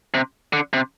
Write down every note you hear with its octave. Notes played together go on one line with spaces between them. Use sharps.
C3
D3
C3